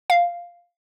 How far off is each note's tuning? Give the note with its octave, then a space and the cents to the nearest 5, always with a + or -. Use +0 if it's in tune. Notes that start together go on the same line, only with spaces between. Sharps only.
F5 +0